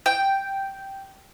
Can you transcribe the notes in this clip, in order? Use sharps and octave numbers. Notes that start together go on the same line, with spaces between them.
G5